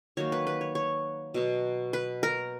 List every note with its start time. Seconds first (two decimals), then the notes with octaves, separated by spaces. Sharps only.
0.17 D#3 F#3 A#3 C#5
0.32 B4
0.47 B4
0.61 C#5
0.75 C#5
1.34 B2 F#3 B3
1.93 B4
2.23 A#4